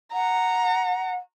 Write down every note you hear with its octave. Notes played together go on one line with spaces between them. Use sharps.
F#5 A#5